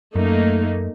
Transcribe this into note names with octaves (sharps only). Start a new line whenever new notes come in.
F#2 A3 A#3 D#4